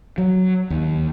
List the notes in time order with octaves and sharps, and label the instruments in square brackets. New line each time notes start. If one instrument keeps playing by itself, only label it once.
[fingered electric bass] F#3
D#2